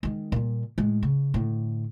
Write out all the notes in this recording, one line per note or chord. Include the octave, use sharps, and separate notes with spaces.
D#3 G#3
A#2 G3
A2 G#3
C#3
A2 D3